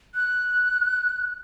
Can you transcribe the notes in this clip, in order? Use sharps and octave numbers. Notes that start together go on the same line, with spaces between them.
F#6